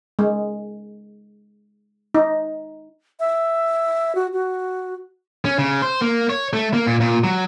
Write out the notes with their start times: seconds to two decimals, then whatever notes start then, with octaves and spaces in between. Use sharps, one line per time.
0.19 G#3
2.14 D#4
3.20 E5
4.15 F#4
4.33 F#4
5.45 C#4
5.58 C#3
5.82 C5
6.02 A#3
6.30 C#5
6.53 A3
6.73 A#3
6.87 A#2
7.00 A#2
7.24 F#3